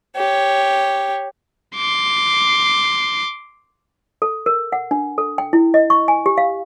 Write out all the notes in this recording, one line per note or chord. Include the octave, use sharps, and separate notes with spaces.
G4 C#5
C6 D6
A4
A#4
F#5
D4
A4
G5
E4
D#5
C#6
G#5
G4
F5